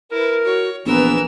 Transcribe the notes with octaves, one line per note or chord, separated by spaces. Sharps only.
E4 A#4 B4
F#4 C#5
A#1 E3 B3 A#4 E6